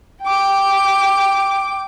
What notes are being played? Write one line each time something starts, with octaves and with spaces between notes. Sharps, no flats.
G5 D6